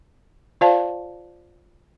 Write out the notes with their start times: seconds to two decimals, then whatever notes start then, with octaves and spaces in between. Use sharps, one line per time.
0.61 F4 C5 D5 F5 A5